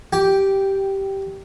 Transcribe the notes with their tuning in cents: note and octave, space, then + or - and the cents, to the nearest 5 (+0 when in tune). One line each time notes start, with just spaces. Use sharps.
G4 -10 G5 +0